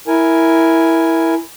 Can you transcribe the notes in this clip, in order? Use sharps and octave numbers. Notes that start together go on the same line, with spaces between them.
E4 A#4 G#5